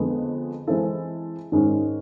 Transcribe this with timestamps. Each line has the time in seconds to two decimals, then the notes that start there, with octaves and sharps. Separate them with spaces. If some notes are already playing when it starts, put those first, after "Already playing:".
Already playing: F2 D3 F3 G#3 B3
0.67 E3 G#3 C4 E4 A4
1.52 G#2 D#3 G#3 C#4